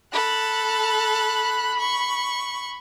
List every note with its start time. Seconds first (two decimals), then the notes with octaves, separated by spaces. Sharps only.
0.13 A4 B5 F#6
1.79 C#6